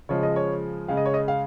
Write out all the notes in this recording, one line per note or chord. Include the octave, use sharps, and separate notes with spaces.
C#3 F3 G#3 C#5
D#5
C#5
C#3 G#3 F5
D#5
C#5
D#5
F5